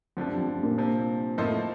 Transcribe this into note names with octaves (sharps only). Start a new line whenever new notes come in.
F2 D3 F3 A3 D4
G2
F2
G2
G2 A#2
C3 F3 C4
F2 A2 F3 A#3 D#4 A4 C5